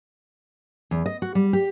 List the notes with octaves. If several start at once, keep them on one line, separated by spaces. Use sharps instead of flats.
E2
D#5
F#4
G3
G4